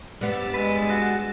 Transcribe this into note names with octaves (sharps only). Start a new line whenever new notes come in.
G2 G3 B3 E6 A6
G#3 B4
F#4